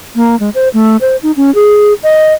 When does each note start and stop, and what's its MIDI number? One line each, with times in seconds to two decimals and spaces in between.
0.15 0.38 58
0.40 0.50 56
0.55 0.69 72
0.74 0.97 57
1.01 1.16 72
1.23 1.32 63
1.37 1.53 61
1.55 1.93 68
2.03 2.33 75